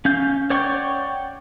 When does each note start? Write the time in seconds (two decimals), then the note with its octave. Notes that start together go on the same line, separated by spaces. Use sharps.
0.05 C#4 F5 G6
0.50 C#5 D5 F#5 G5 C#6